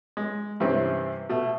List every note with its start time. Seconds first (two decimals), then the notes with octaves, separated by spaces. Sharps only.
0.17 G#3
0.60 G2 C3 E3 C4 C#4
1.29 B2 A3